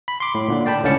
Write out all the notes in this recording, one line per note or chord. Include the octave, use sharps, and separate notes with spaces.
B5
C6 D6
A2
A#2 D3
D5 G5 A5 B5
C#2 A2 D3 C#4 A5 C#7